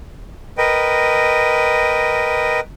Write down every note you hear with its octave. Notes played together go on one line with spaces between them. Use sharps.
A#4 B4 D#5 G5